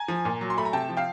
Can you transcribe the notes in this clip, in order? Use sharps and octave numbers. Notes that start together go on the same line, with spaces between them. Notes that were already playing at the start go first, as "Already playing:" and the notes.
Already playing: G#5 A#5
F3
A#2
F#3
C6
A3 B5
A#5
C3 G5 A5
F3
F5 G5